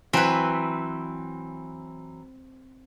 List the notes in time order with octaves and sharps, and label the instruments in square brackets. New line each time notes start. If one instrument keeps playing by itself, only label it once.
[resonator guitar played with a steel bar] E3 F#3 [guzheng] C4 B4